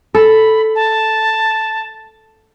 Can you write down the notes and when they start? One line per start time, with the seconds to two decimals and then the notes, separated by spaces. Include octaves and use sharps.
0.15 A4 B5
0.75 A5